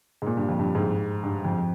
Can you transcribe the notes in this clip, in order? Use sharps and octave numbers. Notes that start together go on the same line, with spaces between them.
G#2
A#2
G2
F2
G2
G#2
G2
F2